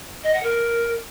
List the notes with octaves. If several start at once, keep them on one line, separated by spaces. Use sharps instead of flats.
D#5
F#5
A#4